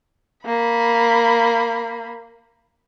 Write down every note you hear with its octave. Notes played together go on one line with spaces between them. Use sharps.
A#3 B5